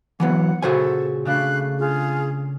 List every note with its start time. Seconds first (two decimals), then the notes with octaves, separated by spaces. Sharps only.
0.20 E3 F#3 B3 F#5
0.62 A#2 C#3 F#4 A4 C5 G#5
1.25 C#3 A3 D4 F5 B5 F#6
1.79 F4 G#4